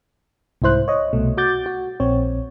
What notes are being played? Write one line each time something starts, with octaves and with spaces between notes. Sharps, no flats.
C2 G#2 E4 C5 F#6
C#5 D#5
C2 B2 A3
F#4 F#5 D6 G6 A6
F#4
A#1 C4 C#5